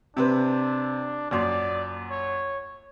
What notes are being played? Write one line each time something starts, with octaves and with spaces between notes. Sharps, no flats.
C3 C4 D4 B4
A#1 F#2 D5 C6
C#5